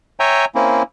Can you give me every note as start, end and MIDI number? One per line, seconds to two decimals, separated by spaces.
0.20 0.45 73
0.20 0.45 76
0.20 0.45 79
0.20 0.45 80
0.20 0.45 82
0.55 0.83 58
0.55 0.83 60
0.55 0.83 61
0.55 0.83 64